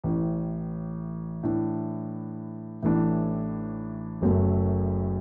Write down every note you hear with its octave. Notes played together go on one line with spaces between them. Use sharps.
A1 A2 E3
A2 E3 D4
A1 A2 E3 A3 D4
F#1 F#2 F#3 A3